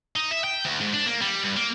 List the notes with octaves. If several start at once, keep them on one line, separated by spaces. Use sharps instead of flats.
D#4
E5
G5
D2
G#2
D4
A#3
G3
G2
A#3